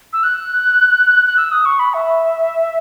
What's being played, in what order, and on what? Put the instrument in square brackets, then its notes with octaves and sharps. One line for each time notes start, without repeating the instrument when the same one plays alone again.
[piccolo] E6
F#6
F#6
E6
D#6
C#6
B5
E5